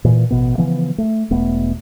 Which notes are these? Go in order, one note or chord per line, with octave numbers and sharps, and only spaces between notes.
A#2 E3
A1 B2 B3
C#3 E3 F3 B3
A3
E1 A3 B3